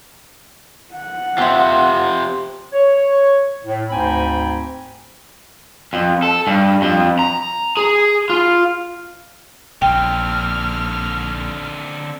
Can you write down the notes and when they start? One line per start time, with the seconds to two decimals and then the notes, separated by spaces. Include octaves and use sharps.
0.93 F#5
1.38 C4 E4 F4 G4
2.73 C#5
3.64 A2
3.90 D2 G#2 C4 G5 G#5 B5
5.93 F2
6.23 A4
6.47 G2
6.82 F2
7.19 A#5
7.77 G#4
8.30 F4
9.82 A#1 D3 C4 G5 F6